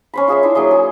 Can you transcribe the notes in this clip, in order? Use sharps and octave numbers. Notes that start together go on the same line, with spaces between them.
C#4 C5 B5
F4 G#4 C5 E5
D4 E4
F#3 A#3 G#4 C6
G#4